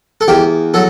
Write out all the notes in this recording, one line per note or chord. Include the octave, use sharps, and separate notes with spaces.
A4
E2 G4
F#3 A4